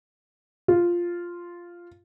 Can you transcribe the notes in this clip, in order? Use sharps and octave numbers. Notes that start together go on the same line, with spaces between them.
F4